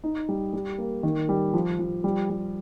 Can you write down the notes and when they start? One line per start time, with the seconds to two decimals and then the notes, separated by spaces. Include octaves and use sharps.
0.04 D#4
0.29 G3
0.53 G3
0.78 A#3
1.03 D#3
1.29 G3
1.54 F3
1.79 F3
2.04 G3
2.30 G3